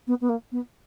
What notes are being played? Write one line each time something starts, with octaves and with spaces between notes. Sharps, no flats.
B3
B3
A#3
B3